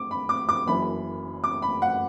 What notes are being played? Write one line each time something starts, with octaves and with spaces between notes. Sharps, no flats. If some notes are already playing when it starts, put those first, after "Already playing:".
Already playing: D6
B5
D6
D6
F#1 F#2 E3 B5
D6
B5
F#5